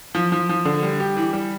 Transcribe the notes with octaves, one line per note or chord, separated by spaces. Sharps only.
F3
F3
F3
D3
G3
G4
E3
G3